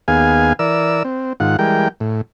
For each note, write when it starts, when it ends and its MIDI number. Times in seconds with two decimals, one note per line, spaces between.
0.08 0.53 39
0.08 0.53 59
0.08 0.53 68
0.08 0.53 77
0.08 0.53 80
0.59 1.03 52
0.59 1.03 70
0.59 1.03 74
0.59 1.03 88
1.05 1.33 60
1.40 1.57 44
1.40 1.57 51
1.40 1.57 65
1.40 1.57 78
1.59 1.88 52
1.59 1.88 55
1.59 1.88 56
1.59 1.88 70
1.59 1.88 79
2.00 2.21 45